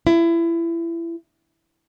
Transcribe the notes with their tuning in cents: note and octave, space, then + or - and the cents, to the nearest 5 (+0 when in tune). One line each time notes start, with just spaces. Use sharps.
E4 +25